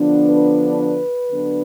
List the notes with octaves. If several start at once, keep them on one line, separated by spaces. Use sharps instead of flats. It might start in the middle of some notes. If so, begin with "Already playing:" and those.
Already playing: D3 F3 B3 D4
B4
D3 F#3 B3 D4